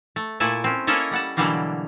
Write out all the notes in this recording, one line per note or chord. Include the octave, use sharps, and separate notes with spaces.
A3
A#2 A3 E4 G#5
C4 C#4
A#3 C#4 E4 A4 C#5 D#5
G3 F#5 A5
B2 D3 E3 F#3 G3 A#3